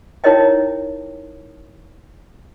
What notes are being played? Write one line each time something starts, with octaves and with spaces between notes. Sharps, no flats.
D#4 E4 A#4 C#5 D#5 G5